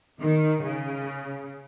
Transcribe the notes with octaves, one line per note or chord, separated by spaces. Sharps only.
D#3
C#3